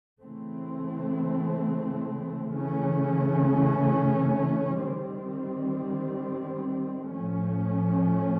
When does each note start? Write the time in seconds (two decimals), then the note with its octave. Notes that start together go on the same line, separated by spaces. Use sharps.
0.22 C#3 E3 A3 C4
2.53 C#3 E3 A3 C#4
4.84 D#3 G3 C4
7.14 A2 F3 A3 C#4